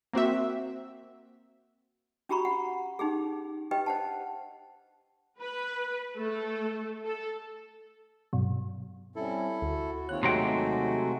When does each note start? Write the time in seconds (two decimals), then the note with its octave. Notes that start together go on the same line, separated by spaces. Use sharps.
0.13 A#3 C4 F#4 E5
2.29 C#4 F#4 G4 A#5 B5 C#6
2.45 F#5
2.99 C#4 D#4 G4 G#4
3.71 G4 B4 D#5 G5
3.86 C5 F#5 A5
5.40 B4
6.17 A3 A4
7.05 A4
8.33 G2 B2 F#3
9.16 G3 C4 C#4 E4 A4
9.62 D2 F#4
10.09 D#2 C4 F4 C#5 F#6
10.23 C3 F#3 G#3 A3 F#4 G5